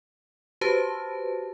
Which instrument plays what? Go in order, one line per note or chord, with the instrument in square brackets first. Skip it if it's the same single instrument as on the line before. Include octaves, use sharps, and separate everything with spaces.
[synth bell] F#4 G4 B4 C5 A5